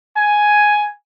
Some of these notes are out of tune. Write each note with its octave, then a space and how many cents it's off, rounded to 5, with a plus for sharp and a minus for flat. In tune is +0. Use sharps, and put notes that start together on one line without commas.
G#5 +5